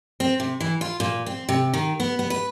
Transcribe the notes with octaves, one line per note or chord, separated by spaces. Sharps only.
C4
C3
E3
F4
A#2
C4
C3
D#3
B3
B3
B4